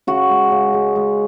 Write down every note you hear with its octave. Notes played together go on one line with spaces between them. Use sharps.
C#3 F#4
G#3
C#3
G#3
G#3